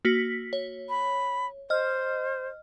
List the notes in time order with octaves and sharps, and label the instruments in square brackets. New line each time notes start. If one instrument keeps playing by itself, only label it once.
[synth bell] A#3 F#4 B6
C#5
[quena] B5
[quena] C5 [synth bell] D#5 F6